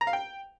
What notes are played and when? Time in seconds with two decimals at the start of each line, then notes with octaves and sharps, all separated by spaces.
0.01 A#5
0.07 F5
0.13 G5